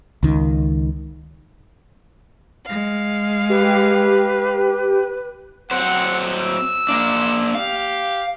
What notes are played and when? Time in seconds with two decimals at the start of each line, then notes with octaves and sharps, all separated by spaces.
0.23 C#2 D#3
2.66 G#3 F5
3.50 G4 B4
5.71 F#3 C4 C5 F#5
6.40 E6
6.89 A#3 D4
7.55 G4 F5